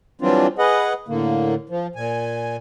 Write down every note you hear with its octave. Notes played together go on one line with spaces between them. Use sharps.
E3 F#3 G3 C4 D4 F4
G#4 B4 D#5 F#5
A2 D3 A#3
F3
A#2 G#5